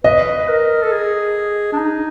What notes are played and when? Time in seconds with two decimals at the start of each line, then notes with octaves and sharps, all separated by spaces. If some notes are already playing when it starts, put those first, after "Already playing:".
0.04 B4 D#5
0.38 B4
0.48 A#4
0.83 A4
0.92 G#4
1.73 D4
1.79 D#4